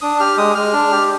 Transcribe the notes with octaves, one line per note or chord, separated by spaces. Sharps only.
D4 D#6
G4 F6
G#3 D#6
G#3 F6
D4
G4